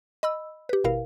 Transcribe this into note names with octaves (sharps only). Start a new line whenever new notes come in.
D#5 B5 E6
G4 B4
G#1 B2 E4 A#4 F5